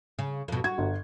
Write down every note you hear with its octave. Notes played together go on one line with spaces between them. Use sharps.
C#3
F2 B2
F#4 G#6
G1